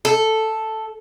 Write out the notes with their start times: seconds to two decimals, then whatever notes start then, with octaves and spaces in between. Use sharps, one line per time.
0.05 A4